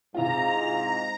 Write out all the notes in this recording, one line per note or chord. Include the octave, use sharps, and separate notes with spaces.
G#2 C3 G#3 E4 F4 A#5